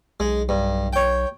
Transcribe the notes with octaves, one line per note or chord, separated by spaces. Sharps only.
B1 G#3
G2
C#5 G5